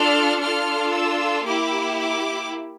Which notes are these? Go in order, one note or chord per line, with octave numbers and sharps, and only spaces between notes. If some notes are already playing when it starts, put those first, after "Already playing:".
Already playing: D4 F4 A4 F6
D4 F4 A4 F6
E6
A#3 E4 G4 D6
D6